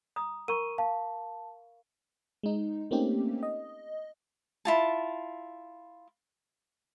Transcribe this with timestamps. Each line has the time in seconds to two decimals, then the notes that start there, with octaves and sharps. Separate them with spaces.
0.16 A#5 D#6
0.48 A#4 A#5 C#6 D#7
0.78 F5 A5
2.43 G#3 D#4
2.91 A3 A#3 C4 C#4 D#4 G4
3.43 D#5
4.65 E4 F4 A5